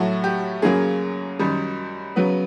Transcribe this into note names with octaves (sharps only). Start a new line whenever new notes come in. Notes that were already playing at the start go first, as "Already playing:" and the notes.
Already playing: A2 F#3 A3 F#4
G4
F#2 C#3 F#3 A#3 G#4
F#2 D#3 G3
C#3 F#3 B3